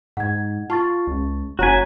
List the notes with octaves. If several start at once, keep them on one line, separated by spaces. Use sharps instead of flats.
G#2 F#5 G#6
F4 A5 C#6 A6
C#2
F#1 F#4 C#5 G#5 A#5 B6